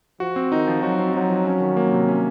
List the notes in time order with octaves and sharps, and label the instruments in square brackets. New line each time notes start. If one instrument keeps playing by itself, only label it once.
[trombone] F3 [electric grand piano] F#4
[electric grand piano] C4
[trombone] D#3 [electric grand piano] D#4
[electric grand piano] F3
[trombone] F#3 [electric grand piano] F#4
[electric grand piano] C4
[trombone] F#3 [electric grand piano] D#4
[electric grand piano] F3
C#4
D#3
A#3
C3
C#4